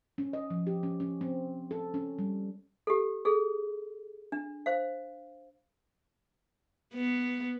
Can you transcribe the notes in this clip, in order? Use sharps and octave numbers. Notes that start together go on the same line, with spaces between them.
C#4
D#5
F3
G4
C#4
C#4
C4
A4
C#4
G3
G4 A4
G#4 A4
D4
C5 F5
B3